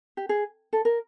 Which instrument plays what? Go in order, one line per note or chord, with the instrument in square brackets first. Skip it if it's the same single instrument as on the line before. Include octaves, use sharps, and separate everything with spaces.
[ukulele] G4
G#4
A4
A#4